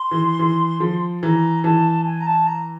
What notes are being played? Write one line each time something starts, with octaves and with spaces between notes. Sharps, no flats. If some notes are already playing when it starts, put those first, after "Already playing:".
Already playing: C6
E3
E3
F3
E3 A#5
E3 A5
G#5
A#5
A5
A#5